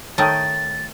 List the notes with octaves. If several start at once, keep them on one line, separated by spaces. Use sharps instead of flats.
D#3 A3 C#5 G5 D#6 A6